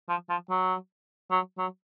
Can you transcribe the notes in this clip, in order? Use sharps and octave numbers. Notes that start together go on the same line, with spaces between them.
F3
F3
F#3
F#3
F#3